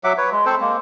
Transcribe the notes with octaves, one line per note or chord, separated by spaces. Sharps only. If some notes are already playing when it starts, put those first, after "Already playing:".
F#3 E5 F#5 D6
B4 C#5
G#3
C4 A4 C5
G#3 A#3